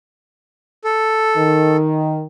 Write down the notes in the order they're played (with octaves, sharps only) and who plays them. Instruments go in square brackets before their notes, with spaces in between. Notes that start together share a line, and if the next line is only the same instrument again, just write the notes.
[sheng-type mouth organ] A4
[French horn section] D#3